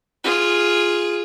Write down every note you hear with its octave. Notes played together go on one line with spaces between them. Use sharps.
F4 G#4